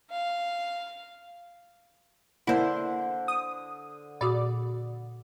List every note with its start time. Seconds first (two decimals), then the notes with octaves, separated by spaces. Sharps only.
0.11 F5
2.47 D3 A#3 E4 C5
3.28 D#6
4.21 A#2 F#4 D5 D#6